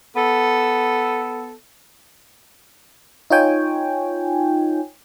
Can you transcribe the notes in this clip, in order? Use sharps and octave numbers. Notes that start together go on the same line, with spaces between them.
B3 A4
D#4 F4 C#5 G5 G#5